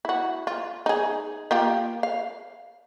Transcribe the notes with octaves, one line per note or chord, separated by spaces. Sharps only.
E4 F#4
F4
D#4 G#4
A#3 F4 G4
F5